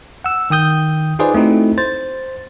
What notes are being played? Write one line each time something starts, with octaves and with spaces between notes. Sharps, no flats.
F#5 E6
D#3 G5 D#6 G6
D#4 F4 G#4 B4 C5 D5
A3 C4 D#4 E4 F#4
C5 A6